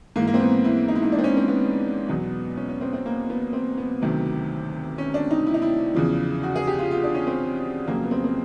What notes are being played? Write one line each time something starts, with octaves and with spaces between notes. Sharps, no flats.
G#2 E3 A#3
A#3
C4
B3
E4
D#4
E4
D#4
D4
C4
C#4
C4
B3
E2 B2 F#3
C#4
C#4
C4
C4
A#3
B3
C4
B3
D2 C3 D#3 F#3
C#4
D4
D#4
E4
D#4
E4
E2 C#3 F3
F#4
G#4
G4
F4
F4
D4
C#4
C4
F2 C#3 F#3 A#3
B3
C4
C4